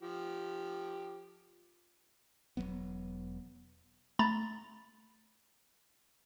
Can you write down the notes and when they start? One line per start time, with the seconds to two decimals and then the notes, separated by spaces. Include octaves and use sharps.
0.02 F3 G4
2.57 E1 E2 F#3 B3
4.19 A3 A#5 B5 A6